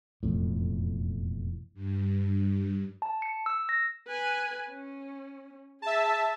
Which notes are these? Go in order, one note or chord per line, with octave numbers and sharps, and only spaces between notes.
E1 F2 A2
G2
A5
C#7
E6
A#6
B4 G#5
C#4
G#4 E5 A5